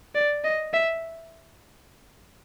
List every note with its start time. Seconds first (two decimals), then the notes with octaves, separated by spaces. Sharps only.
0.15 D5
0.44 D#5
0.73 E5